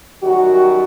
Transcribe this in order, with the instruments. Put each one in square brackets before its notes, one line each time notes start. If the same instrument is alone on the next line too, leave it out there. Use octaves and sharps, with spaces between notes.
[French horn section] F#2 D#3 G3 F#4